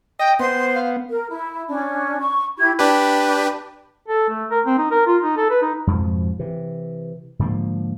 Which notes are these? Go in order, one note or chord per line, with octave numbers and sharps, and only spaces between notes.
D#5 G5
B3 C5 C6
F5
A#4
E4
C#4 D4
C#6
E4 G4 B5 G#6
D4 G4 B4
A4
A3
A#4
C4
D#4
A#4
F4
D#4
A4
B4
D#4
F2 G#2 B2 F3
C3 E3
G#2 D3 F3 A#3